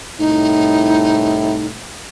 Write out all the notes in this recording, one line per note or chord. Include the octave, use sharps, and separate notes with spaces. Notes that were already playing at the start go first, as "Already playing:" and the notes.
C2 A2 D#4